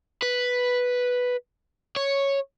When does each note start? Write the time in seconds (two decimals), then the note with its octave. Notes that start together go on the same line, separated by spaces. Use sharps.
0.23 B4
1.96 C#5